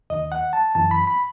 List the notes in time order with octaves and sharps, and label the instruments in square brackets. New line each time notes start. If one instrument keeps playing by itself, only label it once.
[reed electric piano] D#2 D#3 D#5
F#5
A5
F#2 E3 A5
B5
B5